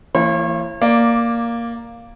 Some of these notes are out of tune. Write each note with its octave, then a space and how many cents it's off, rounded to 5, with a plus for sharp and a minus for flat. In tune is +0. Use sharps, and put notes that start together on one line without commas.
E3 +20 A#3 -35 C#5 -40
A#3 +0 D5 +0